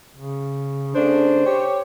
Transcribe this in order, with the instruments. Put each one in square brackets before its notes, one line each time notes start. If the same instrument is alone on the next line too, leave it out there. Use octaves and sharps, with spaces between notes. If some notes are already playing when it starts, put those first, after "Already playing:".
[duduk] C#3
[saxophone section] C#3 A3 D4 [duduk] C5
[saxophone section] G4 C#5